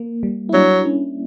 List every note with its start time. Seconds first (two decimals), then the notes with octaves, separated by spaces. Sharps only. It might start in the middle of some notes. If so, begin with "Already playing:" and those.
Already playing: A#3
0.23 G3
0.49 E4
0.53 F#3 D4
0.85 C#4